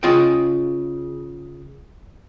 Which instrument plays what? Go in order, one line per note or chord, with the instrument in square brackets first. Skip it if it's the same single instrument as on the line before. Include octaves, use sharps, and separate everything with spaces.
[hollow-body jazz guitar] C#3 F4 D#5 G5